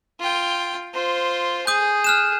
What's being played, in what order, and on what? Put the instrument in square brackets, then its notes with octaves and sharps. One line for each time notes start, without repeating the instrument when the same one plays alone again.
[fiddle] F4 G5
F4 C5
[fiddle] G#4 [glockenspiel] D#6 G6
[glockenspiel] F6 F#6 E7